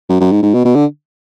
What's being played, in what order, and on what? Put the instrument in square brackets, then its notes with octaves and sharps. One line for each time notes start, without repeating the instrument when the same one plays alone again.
[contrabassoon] F#2
F#2
G#2
G#2
B2
B2
D3